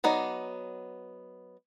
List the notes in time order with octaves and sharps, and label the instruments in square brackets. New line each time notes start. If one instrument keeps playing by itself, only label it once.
[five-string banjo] F#3 B3 D#4 D5